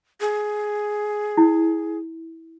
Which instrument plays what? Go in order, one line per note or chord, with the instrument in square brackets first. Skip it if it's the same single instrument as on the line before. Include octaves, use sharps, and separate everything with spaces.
[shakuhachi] G#4
[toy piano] E4